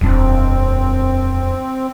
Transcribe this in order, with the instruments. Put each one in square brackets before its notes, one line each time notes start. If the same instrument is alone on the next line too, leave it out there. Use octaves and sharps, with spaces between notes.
[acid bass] D#1 [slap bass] F2 F3 D4 [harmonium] C4